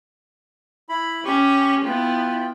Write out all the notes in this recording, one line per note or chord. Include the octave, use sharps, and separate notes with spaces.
E4 B5
C#4 G4 C#6
B3 E4 F4 G5